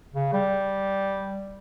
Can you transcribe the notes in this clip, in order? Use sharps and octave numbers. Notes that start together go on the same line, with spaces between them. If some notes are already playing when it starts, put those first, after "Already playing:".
C#3
G3